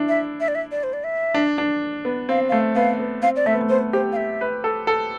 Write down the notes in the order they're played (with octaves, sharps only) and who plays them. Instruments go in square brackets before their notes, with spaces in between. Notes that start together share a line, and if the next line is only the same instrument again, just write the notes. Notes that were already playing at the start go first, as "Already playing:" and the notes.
Already playing: [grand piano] D4 E4
[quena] E5
E5
D5
E5
D5
C5
D5
E5
[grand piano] D4
D4
B3
[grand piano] C4 [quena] F5
[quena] F5
[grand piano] A3
[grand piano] B3 [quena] F5
[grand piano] B3
[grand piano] C4 [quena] F5
[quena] D5
[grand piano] A3 [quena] E5
[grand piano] B3
A3
[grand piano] B3 [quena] C5
[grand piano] G4 [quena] C5
[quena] F5
E5
[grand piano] B4
A4
A4